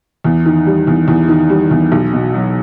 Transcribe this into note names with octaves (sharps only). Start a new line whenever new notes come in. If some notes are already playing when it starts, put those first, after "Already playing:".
E2
D#3
G3
E2
E2
D#3
G3
E2
B1
B2
F#3